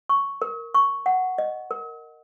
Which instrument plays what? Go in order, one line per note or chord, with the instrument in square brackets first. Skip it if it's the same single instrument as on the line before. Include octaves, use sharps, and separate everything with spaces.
[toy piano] C#6
A#4
C#6
F#5
D#5
A#4